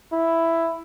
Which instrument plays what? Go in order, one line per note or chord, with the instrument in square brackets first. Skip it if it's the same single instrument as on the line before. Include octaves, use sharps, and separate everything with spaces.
[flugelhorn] E4